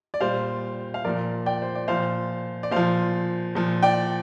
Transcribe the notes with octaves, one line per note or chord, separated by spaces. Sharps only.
D5
A#2 G3 C5 F5
F5
A#2 F3 A#4 D5
D5 G5
C5
D5
A#2 F3 C5 F5
D5
A#2 F3 C5 F5
A#2 F3
D5 G5